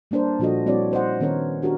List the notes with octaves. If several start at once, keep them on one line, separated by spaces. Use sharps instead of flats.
G3 A#3 D4 A#4 C5
A#2 F3 D4 F#4 A4 D#5
G3 C4 E4 F#4 C#5 D5
D#4 C5 D#5 F#5
D#3 B3 C#4 A#4 C#5
D4 F#4 G4 A#4